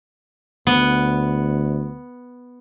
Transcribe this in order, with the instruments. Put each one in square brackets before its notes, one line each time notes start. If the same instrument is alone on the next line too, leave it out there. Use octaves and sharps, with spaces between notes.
[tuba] D2 [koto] B3